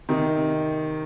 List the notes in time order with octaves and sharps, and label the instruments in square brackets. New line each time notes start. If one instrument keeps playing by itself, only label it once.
[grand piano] C3 D#3